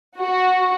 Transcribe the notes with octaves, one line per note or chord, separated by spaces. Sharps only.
F#4